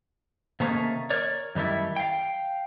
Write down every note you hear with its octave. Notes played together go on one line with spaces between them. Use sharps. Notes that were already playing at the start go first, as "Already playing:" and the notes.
C3 D#3 A3 A#3 C#4 G#4
A#4 C#5 D5
F#2 D#3 G3 A3 E4
F5 G5